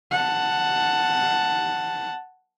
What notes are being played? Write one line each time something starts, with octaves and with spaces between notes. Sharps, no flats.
F#5 A5